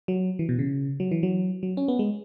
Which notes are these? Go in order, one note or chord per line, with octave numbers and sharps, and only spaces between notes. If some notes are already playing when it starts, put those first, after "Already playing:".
F#3
E3
B2
C#3
F#3
E3
F#3
F#3
C#4
B3
G#3